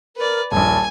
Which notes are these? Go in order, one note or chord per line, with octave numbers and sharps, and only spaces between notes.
A#4 B4 D5
D#1 A#1 G#5 A5